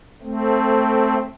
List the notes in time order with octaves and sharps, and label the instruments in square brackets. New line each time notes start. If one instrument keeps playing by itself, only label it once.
[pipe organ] A3 C4